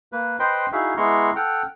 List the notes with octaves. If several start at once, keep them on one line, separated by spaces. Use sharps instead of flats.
A#3 B4
B4 C5 D#5 G5 B5 C6
D#4 E4 F#4 G#4 E5 F5
G#3 B3 E4 A#5 C6 C#6
A4 F#5 G5 F6